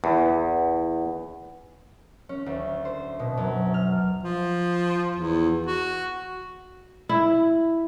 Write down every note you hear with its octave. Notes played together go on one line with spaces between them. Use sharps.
E2
C#4
D2
C5
B2
F#2
F6
F3
E2
F#4
E4